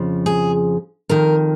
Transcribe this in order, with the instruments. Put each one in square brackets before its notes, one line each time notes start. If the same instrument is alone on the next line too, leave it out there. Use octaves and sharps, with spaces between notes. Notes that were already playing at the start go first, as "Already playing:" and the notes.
Already playing: [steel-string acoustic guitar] F2 C#3 F3
G#4
F2 D#3 A#4